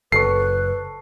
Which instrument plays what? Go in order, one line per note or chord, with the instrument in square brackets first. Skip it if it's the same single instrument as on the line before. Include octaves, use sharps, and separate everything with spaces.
[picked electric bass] F#1 [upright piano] A4 C#6 [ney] B4 [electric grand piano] C7